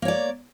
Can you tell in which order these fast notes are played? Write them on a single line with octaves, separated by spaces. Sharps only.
A#3 C#5 D5